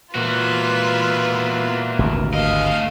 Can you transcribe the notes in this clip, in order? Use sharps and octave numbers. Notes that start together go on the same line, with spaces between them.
A#2 E3 F4 F#4 B4
G#1 D2 G2
A3 D#5 F5